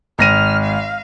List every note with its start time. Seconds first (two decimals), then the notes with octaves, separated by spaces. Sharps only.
0.19 G#1 F6 A#6 D#7
0.63 F5